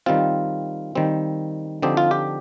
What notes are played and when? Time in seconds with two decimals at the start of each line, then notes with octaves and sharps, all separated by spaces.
0.06 D#3 G3 C4 F4
0.95 D#3 G3 C4
1.82 D3 F3 C4 D#4 G4
1.97 F4
2.11 G4